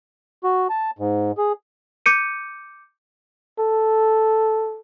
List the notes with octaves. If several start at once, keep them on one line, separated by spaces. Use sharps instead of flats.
F#4
A5
G#2
G#4
D6 G6 C#7 D#7
A4